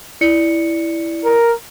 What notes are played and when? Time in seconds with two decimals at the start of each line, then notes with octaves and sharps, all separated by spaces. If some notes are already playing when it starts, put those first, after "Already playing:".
0.21 E4 D5 C#7
1.24 A#4